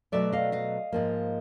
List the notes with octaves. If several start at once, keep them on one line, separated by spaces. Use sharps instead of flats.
B2 F#3 A3 D5 E5
D#5 F5
D#5 F5
G#2 F3 A#3